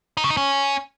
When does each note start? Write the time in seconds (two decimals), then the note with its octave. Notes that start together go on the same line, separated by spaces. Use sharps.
0.17 D#4
0.24 C#3
0.30 D#4
0.37 C#4